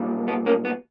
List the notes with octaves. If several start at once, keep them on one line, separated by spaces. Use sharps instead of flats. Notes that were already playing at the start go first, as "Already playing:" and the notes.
Already playing: B1 A#2 G3
B3
A#3 C#4
B3